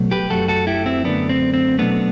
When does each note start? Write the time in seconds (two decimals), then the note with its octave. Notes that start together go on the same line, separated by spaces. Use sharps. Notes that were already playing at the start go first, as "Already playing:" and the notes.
Already playing: B2 F#3 A3
0.11 G4 B4
0.30 F#2 F#3 A3 F#4 A4
0.48 F#4 A4
0.67 E4 G4
0.86 C4 E4
1.04 F#2 D3 A3 B3 D4
1.29 C4
1.54 C4
1.78 B2 F#3 A3 B3 D4